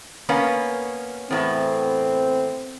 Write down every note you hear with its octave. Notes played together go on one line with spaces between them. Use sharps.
A#3 B3 C#4
E2 A2 B3 C4